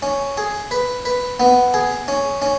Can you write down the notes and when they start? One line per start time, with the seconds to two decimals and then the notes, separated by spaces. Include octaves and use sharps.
0.02 C#4
0.37 G#4
0.71 B4
1.05 B4
1.40 B3
1.74 G#4
2.08 C#4
2.42 C#4